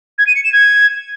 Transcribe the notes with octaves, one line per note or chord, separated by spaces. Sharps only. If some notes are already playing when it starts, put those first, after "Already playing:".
G#6
D#7
C#7
E7
G#6